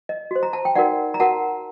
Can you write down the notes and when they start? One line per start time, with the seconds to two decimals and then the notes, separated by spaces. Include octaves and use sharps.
0.09 D#5
0.31 F#4 C5
0.43 A#5
0.53 A5
0.65 G5
0.75 D#4 F#4 A#4 D5 F#5
1.14 A#5
1.20 F#4 A#4 F#5 A5